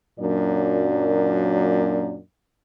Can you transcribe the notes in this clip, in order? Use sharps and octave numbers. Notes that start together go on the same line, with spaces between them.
F#2 A#2 F#3 A#3 D4 D5